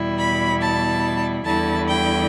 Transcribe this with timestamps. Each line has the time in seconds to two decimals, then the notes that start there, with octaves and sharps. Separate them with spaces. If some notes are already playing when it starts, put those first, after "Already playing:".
Already playing: E2 B2 G3 E4
0.19 B5
0.62 A5
1.45 E2 D3 G3 E4 A5
1.88 G5